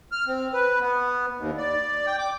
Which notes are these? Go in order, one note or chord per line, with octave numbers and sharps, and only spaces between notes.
F6
C4
B4
B3
D#2
D5
G5
D6